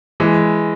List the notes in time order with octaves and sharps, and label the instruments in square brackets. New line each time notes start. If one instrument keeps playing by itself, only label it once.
[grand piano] E3 G#3